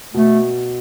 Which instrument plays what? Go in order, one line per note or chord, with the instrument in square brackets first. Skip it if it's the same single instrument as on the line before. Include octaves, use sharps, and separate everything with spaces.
[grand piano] B2 [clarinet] A3